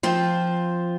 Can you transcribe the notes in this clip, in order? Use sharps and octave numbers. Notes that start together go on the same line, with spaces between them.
F3 C4 F4